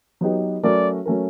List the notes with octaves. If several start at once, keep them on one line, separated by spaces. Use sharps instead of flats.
F#3 B3 D#4 G4 B4
F#3 A3 C#4 F#4 A#4 D5
F#3 A3 C#4 F#4 A#4